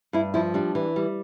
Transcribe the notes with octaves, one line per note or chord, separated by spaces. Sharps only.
G2 E4
F3 E4
G3 D4
E3
G3